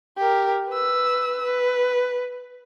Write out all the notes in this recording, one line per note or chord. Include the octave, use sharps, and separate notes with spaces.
G4 A#4
B4 E6
B4